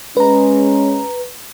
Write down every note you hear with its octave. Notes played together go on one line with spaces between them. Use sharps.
G#3 C#4 B4 A#5